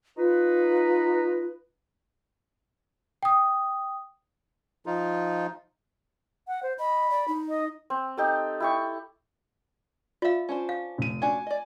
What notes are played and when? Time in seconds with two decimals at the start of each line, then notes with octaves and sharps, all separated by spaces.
0.18 D#4 F4 B4
3.23 G5 D#6
4.86 F3 D#4 F4
6.48 F#5
6.63 C5
6.79 D#5 B5
7.10 D5
7.27 D#4
7.49 D#5
7.90 C4
8.17 D#4 G4 A4
8.60 E4 G4 C#6
10.22 F4 D5 E5 F5
10.49 C#4 D4 C5
10.69 F5
10.98 F1 D#7
11.22 C#4 D4 F#4 G#5
11.47 D5 D#5